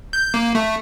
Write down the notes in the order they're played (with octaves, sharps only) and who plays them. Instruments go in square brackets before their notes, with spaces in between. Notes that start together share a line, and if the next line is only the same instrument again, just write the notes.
[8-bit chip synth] G6
A#3
A3